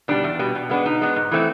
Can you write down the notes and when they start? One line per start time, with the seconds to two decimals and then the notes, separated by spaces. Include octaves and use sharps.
0.08 B2 G3 D4
0.24 E2
0.39 B2 G3
0.55 B2
0.69 G#3 B3 D4
0.86 B2 D#4
1.01 G#3 B3 D4
1.16 G#2
1.31 E3 A3 C4